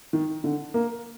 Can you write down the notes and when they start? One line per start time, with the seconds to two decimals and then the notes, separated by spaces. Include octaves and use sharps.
0.13 D#3
0.44 D3
0.74 A#3